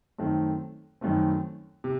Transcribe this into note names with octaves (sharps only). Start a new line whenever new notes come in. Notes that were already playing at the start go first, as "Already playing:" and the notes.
F#2 D#3 A3 C4
F#2 D#3 A3 C4
C3